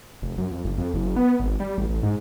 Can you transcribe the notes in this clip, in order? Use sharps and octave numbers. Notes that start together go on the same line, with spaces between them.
F1
F#2
F2
F#1
F2
F#1
B3
G#1
G3
A1
A1
G#2